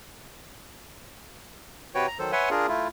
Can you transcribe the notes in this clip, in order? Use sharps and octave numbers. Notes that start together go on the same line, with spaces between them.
C3 F#4 B4 C#5 G5
A#5
D#3 F#3 A4 C5
B4 C#5 E5 F#5 G#5 C6
D4 F4 G#4 A#4
A3 E4 F4